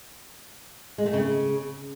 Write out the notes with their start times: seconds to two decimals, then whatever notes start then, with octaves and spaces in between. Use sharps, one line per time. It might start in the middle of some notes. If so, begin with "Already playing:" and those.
0.98 G#3
1.06 A3
1.13 C#3